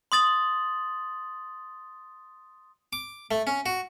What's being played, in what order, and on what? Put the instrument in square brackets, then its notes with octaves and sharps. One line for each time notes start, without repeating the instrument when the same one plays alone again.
[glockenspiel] C6 D#6 A6 F#7
[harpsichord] D6
A3
C#4
F#4